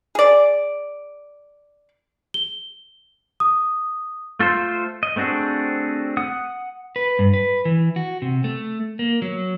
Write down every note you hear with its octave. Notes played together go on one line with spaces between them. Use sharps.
G#4 D5
G7
D#6
A3 F4 A4 C5
D#5
A3 C4 D4 F#4 G#4
F#5 D#6
B4
G2
B4
E3
F#4
C3
A3
A#3
F#3